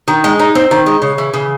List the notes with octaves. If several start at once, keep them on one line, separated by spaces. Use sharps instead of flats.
D#3
G#3
D#4
C4
D#3
G#3
C#3
E3
C#3